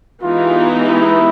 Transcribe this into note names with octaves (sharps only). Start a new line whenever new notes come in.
E3 G#3 B3 D#4 F4 G4
E4